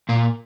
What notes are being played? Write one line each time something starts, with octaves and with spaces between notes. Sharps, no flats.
A#2 A#3